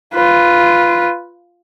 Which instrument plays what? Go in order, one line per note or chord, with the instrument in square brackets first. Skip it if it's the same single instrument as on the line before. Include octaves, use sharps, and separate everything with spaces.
[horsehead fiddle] F4 B4